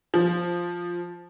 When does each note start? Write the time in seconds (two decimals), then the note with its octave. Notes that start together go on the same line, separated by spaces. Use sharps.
0.14 F3